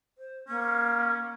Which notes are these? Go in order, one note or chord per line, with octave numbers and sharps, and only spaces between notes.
C5
A#3 C#4